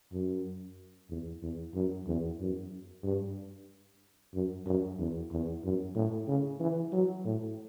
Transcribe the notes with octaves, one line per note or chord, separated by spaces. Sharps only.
F#2
E2
E2
F#2
E2
F#2
G2
F#2
F#2
E2
E2
F#2
A2
C#3
E3
F#3
A2